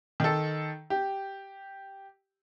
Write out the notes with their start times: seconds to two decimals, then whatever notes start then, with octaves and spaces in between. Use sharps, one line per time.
0.20 D#3 A4
0.90 G4